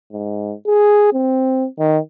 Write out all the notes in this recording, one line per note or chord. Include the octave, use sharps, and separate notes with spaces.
G#2
G#4
C4
D#3